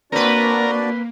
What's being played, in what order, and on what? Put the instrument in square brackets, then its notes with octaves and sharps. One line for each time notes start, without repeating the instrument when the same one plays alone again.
[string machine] A#3 [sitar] C4 B4 [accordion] D4 F#4 D5 [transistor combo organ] A#4